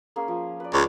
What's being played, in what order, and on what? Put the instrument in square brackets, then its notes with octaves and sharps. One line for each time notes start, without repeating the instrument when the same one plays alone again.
[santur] A#3 C#4 G#4
F3
B4 D5
[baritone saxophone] C#2